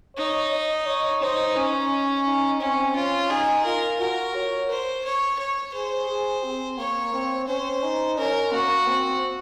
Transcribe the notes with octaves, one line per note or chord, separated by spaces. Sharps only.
D#4 C#5
D#5
C#5
D#4 C5
C#4 D#4
D#4
C4 C#4
C#4 F4
D#4 G#4
F4 A#4
F#4 A#4
C#5
C5
C#5
C#5
G#4 C5
G#4
C4
A#3 C#5
C4
C#4 C5
D#4
C#4 A#4
A#3 F#4
C4